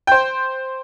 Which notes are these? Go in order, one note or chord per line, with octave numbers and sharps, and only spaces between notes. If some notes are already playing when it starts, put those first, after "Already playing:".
C5 G5